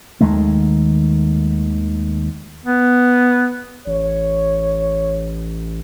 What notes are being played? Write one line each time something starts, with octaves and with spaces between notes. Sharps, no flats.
D#2 D#3 G#3 A3
B3
A1 C#5